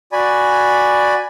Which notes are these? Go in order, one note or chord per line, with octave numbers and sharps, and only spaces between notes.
F#4 D5 G#5 B5